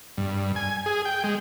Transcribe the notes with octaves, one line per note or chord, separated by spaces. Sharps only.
G2
G#5
G#4
G5
G#3